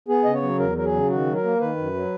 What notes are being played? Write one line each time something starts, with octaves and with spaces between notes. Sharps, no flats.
B3 G#4
C#3 D#5
C#5
F#3
E2 A#4
F#3 A#4
G#4
C#3
D#3 F#4
F#3
A#4
A#3
D#3 B4
F#2
F#3